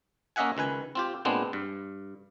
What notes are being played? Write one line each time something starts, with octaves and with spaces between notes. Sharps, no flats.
A#3 C#4 D#5 E5 F#5 G#5
C#2 D#3 B4 G#5
C4 F4 G4
A#2 G#3 B3 C4 D4
G2